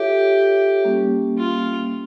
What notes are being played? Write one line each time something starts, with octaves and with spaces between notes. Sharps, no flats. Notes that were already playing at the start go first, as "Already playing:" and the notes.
Already playing: F4 G4 A4 C#5 E5
G3 A#3 C#4
F4
C#4